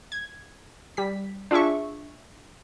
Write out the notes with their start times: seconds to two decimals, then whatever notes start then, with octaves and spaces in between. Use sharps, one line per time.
0.12 G#6
0.97 G3 B6
1.51 D4 F4 G#4 E5 C#6